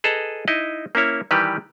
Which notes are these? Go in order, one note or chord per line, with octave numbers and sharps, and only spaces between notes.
G#4 A4 B4 D#5 A5 A#5
D#4 E4 D#5
A#3 C#4 E4 C#5
D#3 E3 G3 G4 B4